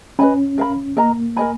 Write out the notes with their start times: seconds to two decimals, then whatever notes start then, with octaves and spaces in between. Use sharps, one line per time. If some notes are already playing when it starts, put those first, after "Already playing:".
0.19 C#4 B4 D#5 G#5 B5
0.58 A#4 F5 B5
0.97 A#3 A#4 D#5 A#5
1.36 A#4 D#5 G#5 B5